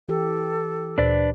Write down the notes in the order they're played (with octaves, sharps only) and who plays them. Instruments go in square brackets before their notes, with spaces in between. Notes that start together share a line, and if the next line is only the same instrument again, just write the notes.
[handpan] E3 G4 [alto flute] A4
[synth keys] D2 A#2 C5 [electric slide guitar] D4 B4 D5